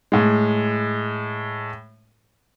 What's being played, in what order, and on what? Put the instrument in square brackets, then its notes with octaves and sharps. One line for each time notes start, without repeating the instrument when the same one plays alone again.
[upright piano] A2 G#3